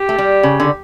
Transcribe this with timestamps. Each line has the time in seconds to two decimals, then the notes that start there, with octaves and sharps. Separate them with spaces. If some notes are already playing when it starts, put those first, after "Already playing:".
Already playing: G4
0.09 A3
0.18 G3
0.43 C#3
0.60 D3